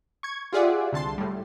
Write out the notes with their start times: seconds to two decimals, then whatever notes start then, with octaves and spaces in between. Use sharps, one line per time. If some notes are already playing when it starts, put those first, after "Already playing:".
0.23 C#6 G#6
0.53 F4 G4 G#4 D5 E5 F#5
0.92 C2 D3 A5 C6
1.18 A2 G3